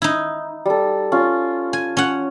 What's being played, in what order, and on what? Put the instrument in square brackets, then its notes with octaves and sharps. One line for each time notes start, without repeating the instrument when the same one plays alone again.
[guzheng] D#4 E4
[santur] G3 A4
C#4 F4
[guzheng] G#5
C#4 F#5